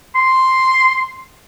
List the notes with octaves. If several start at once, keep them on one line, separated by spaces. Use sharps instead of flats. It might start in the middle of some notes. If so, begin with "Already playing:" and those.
C6